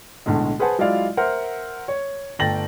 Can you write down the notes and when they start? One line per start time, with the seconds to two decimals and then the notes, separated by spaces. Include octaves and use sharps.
0.26 B1 A2 D3 G#3
0.59 G#4 B4 C5 F#5 G#5 A5
0.79 F#3 G#3 E4 F4 D5 F5
1.17 A#4 C5 E5 F#5
1.88 C#5
2.39 G1 A3 G5 A6 A#6 F#7